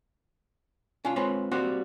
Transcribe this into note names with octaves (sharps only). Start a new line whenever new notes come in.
C#4 D4 F4
G#3 C4 F4 B4 C#5
G3 A#3 C4 F#4